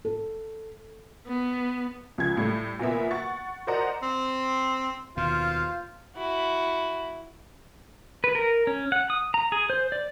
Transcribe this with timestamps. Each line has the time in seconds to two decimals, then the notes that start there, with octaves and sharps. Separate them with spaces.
0.05 A4
1.27 B3
2.18 C#2 C#3 F3 G#6
2.37 A2 G3 A3
2.79 A#2 A#3 B3 E5
3.11 F#5 C#6 A6
3.67 A#4 C5 D5 D#5 F#5 A#5
4.02 C4
5.17 D#2 B2 F4 C5 F5
6.17 E4 F#4
8.24 B4
8.35 A#4
8.67 C#4
8.92 F#5
9.10 D#6
9.34 A#5
9.52 G#4
9.70 C5
9.92 D5